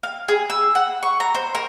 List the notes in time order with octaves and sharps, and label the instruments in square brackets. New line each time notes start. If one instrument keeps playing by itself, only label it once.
[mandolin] F5
G#4
E6
F#5
C#6
A#5
C5
A#4